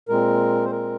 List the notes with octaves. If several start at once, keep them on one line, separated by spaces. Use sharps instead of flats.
A#2 G#3 C4 A#4
C5
A#4